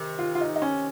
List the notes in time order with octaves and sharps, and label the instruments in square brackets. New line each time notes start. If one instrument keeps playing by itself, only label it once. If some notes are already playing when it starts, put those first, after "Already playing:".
Already playing: [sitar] C3 D#3
[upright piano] F4
F4
D#4
D#4
C#4